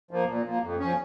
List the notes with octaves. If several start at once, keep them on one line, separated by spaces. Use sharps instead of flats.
F3 A#3
A#2
F3 A#3
F2
F3 C#4